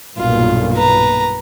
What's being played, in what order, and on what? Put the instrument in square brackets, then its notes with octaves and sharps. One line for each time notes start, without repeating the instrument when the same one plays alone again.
[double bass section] B1 G2 A#2 [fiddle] F4
[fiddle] B4 A#5